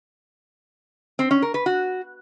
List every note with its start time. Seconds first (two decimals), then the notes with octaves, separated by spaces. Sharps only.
1.19 C4
1.31 C#4
1.42 A#4
1.54 B4
1.66 F#4